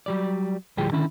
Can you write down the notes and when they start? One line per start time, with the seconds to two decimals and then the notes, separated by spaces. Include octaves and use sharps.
0.06 F#3 G3 D5
0.77 D2 A2 F3 G3 G#4 G5
0.92 D3 D#3 C#4 E4